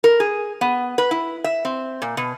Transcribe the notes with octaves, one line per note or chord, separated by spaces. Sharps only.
A#4
G#4
B3
B4
E4
E5
C4
A#2
B2